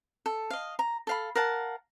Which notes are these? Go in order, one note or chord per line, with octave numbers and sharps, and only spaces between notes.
A4
D#5 F5
A#5
A4 F5 B5
A#4 F5 F#5 A5